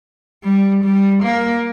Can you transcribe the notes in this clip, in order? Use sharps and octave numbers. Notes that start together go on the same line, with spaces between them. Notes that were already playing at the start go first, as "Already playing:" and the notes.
G3
G3
A#3